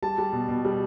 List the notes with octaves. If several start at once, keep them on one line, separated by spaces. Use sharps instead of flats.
G3 A5
G3
B2
B2
G3